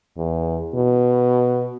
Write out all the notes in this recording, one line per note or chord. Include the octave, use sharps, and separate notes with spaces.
E2
B2